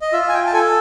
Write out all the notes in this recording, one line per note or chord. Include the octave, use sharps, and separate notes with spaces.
D#5
F4 E5
G#5
G5
A5
A4 G#5